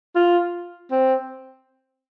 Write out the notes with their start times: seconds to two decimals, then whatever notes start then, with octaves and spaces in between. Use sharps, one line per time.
0.16 F4
0.91 C4